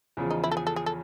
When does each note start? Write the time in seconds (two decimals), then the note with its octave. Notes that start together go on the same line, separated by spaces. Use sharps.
0.17 E2 C#3 F3
0.31 D#4
0.44 E4
0.51 A4
0.57 G#4
0.67 A4
0.76 G#4
0.86 A4